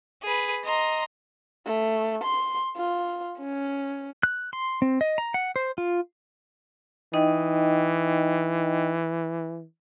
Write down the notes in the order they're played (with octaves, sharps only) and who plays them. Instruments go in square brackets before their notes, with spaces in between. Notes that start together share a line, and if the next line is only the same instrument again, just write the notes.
[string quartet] G#4 B4
D#5 A#5 C6
[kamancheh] A3
C6
F4
C#4
[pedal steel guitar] F#6
C6
C4
D#5
A#5
F#5
C5
F4
[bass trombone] E3 [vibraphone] D#4 D#5 G5